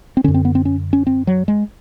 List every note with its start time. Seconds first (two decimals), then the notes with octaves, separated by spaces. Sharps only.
0.17 C4
0.24 D3 C#4
0.28 F#2
0.34 C4
0.45 B3
0.55 C4
0.65 C#4
0.93 C#4
1.07 C4
1.27 F#3
1.48 G#3